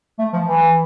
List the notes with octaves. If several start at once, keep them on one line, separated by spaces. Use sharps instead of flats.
A3
F3
E3